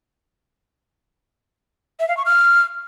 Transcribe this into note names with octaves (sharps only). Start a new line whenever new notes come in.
E5
F5
C#6
F6